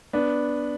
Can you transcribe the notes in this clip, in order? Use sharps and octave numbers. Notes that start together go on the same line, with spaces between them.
B3 D4